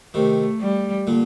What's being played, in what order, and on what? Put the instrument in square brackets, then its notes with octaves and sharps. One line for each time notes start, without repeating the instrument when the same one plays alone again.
[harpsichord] C3 D#3 [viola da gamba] A3
[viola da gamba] G3
[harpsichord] A#2 D3